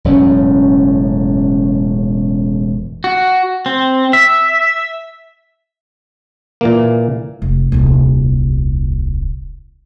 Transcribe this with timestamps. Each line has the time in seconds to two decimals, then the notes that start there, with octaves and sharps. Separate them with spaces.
0.04 E1 F#2 A2 C#4
3.04 F#4
3.66 C4
4.13 E5
6.61 A#2 E3 A#3
7.42 F1
7.72 D#1 C2